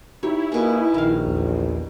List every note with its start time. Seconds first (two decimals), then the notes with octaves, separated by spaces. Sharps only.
0.23 D#4 E4 G4 C#5
0.52 B2 A#3 G#4
0.94 A#1 D#3 F5
1.27 E2